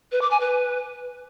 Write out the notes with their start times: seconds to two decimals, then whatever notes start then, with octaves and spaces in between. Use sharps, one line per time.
0.12 B4
0.21 D6
0.31 G#5
0.40 B4